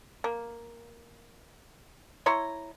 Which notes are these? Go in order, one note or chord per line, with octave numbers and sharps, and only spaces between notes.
A#3
E4 C#5 A#5 C6